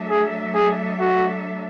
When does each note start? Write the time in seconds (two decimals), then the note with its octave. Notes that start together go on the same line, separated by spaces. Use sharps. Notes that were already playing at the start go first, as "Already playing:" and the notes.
Already playing: F#3 A3 D4 A4 E5
0.10 G#4
0.55 G#4
1.00 F#4